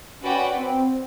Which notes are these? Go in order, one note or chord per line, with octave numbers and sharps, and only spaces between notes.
C#4 F#4 B4 D5 G5
C4